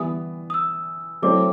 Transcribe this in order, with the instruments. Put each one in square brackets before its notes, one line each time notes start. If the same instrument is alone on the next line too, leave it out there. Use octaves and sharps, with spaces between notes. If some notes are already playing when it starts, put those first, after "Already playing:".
Already playing: [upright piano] E3 G3 B3 [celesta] D#6
[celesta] D#6
E6
[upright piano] F#3 A3 C4 E4 [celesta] D6